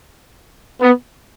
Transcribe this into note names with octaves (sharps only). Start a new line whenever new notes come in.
B3